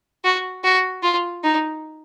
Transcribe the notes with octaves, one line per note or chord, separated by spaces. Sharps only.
F#4
F#4
F4
D#4